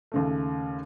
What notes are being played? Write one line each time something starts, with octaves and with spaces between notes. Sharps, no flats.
D#2 C#3 A3